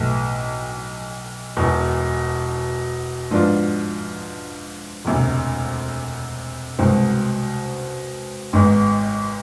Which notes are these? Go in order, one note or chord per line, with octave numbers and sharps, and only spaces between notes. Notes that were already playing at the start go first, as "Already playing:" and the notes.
Already playing: B1 A2 E3 A3
E1 E2 B2
G#2 F3 B3 D4 F4
E1 D2 C3
C2 B2 G#3 C4
G#1 G#2 G#3 B3